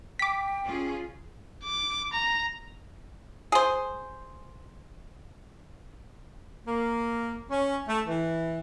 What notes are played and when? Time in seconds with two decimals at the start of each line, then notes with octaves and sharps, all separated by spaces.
0.19 G5 D6 B6
0.64 C#4 F4 G#4
1.64 D6
2.13 A#5
3.52 G#4 C5
6.66 A#3
7.49 C#4
7.87 A3
8.06 E3